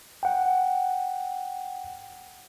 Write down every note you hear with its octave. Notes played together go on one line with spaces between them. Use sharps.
F#5 G5